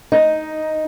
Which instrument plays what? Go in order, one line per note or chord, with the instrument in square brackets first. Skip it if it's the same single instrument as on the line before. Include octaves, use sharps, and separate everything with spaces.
[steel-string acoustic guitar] D#4